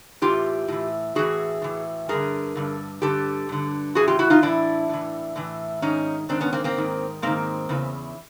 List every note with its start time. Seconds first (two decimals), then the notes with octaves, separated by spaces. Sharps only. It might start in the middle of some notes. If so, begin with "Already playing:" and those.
0.21 A2 E3 F4 G4
0.68 A2 E3
1.15 A2 E3 F#4 G#4
1.62 A2 E3
2.09 G2 D3 G#4 A#4
2.55 G2 D3
3.02 G2 D3 G4 A4
3.49 G2 D3
3.95 E3 F#4 G#4
4.00 A2
4.08 F4 G4
4.19 E4 F#4
4.30 D#4 F4
4.42 A2 E3 D4 E4
4.89 A2 E3
5.36 A2 E3
5.82 G#2 D#3 C#4 D#4
6.29 G#2 D#3 C4 D4
6.40 B3 C#4
6.53 A#3 C4
6.64 A#3 C4
6.77 G#2 D#3
7.22 G#2 D#3 A#3 C4
7.69 E2 C#3 E3